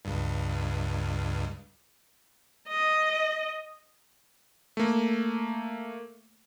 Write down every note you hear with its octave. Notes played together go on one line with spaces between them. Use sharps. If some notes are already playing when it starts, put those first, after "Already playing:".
C#2 G2
D#5
A3 A#3